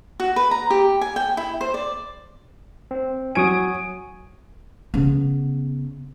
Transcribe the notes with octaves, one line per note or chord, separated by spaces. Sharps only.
F#4
B4
A#5
G4
G#5
G5
E4
C5
D5
C4
F#3 G#5 C#6 D#6 D7
C#3 B3